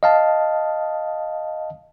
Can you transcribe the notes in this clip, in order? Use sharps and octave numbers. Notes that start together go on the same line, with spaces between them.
D#5 F5 A5